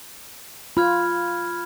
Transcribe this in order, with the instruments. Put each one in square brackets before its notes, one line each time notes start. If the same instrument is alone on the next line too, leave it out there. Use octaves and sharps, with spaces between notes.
[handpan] F4 [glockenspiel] B5 F6 G#6